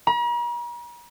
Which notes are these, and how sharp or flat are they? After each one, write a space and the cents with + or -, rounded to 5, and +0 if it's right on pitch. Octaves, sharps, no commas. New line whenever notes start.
A#5 +45